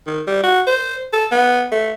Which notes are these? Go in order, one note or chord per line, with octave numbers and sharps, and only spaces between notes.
D#3
G3
F#4
C5
A4
B3
A3